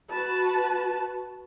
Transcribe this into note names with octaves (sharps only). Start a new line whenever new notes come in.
F#4 B4 A5